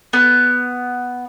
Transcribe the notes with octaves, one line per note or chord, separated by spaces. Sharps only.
B3